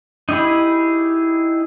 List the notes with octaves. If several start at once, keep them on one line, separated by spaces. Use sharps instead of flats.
D#4 E4 G4 G#4 B5